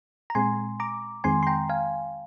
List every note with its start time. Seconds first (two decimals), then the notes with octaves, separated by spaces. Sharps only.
0.30 A#5
0.35 A#2 G#3 C4 G#5 C6
0.80 A#5 D6
1.24 F2 D#3 G#3 C4 G#5 C6
1.43 C6
1.47 G5 A#5
1.70 F5 G#5